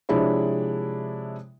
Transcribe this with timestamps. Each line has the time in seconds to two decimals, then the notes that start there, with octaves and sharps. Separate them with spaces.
0.09 C3 F3 G#3 D4 E4 C#5